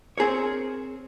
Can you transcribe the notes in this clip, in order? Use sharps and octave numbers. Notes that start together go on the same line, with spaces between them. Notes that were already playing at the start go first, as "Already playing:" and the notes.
C4 G#4 A#4 C#5